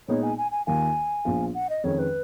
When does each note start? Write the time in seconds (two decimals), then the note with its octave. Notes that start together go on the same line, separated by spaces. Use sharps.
0.08 A#2 G#3 B3 D#4 C#5
0.23 G#5
0.38 G#5
0.51 G#5
0.66 D#2 D#3 A#3 F4 G#5
1.25 A#1 A#2 F3 B3 F4
1.54 F#5
1.70 D#5
1.84 F2 D#3 G#3 C#4 C#5
1.99 B4